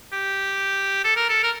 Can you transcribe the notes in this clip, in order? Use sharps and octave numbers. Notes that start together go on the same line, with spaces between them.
G4
A4
A#4
A4
A#4